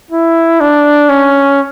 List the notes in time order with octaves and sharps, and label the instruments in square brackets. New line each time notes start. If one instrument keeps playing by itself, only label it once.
[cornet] E4
D4
C#4